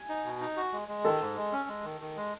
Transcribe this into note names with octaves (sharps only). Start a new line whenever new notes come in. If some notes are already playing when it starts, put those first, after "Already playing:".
Already playing: G#5
D#4
B2
D#4
F#4
G#3
G#3
D#3 A4
G#2
G#3
C#4
G#3
D#3
D#3
G#3